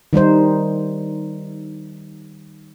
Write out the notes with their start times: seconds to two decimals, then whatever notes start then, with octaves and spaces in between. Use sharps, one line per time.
0.13 D#3 G3 D#4 C5